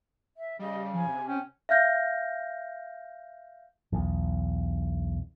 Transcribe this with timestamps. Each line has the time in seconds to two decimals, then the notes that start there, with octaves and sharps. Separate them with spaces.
0.37 E5
0.59 C#3 G3 D#5
0.93 F3 G#5
1.07 C3
1.27 C#4 G5
1.69 E5 F5 F6 G6 A#6
3.92 B1 E2